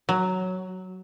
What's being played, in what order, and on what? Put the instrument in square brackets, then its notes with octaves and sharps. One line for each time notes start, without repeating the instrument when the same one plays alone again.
[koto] F#3